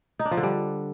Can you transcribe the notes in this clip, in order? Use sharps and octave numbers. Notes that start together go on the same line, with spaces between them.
D#4
D4
F3
D3
G3